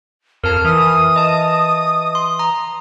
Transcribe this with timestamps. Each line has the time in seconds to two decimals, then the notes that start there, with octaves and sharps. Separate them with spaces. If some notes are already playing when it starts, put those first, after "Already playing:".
0.44 F2 A#4 A5 F6
0.65 E3 D#6
1.16 D#5 A5
2.15 C6
2.39 A#5